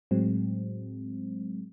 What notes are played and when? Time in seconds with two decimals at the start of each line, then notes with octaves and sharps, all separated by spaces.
0.11 A2 F#3 G#3 C4